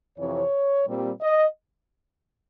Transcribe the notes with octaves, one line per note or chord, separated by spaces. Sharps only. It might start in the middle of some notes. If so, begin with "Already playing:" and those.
F2 C3 E3 C#5
A#2 G3 C4
D#5